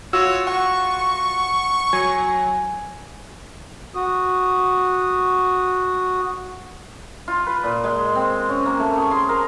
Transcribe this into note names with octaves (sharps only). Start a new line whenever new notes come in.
F4 F#4 C#5 E6
F#5 C#6
F#3 G#5
F#4 D#6
F4
B4
A#2
G#3
C4
C#4
A#3
A3
G#4
C6
A#4